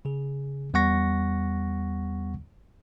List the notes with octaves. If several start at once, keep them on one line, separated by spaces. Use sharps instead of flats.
C#3 G#4
E2 G3 B3 F#5 C#6 A#6